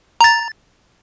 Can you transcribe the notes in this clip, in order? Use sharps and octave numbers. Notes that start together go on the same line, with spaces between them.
A#5 A6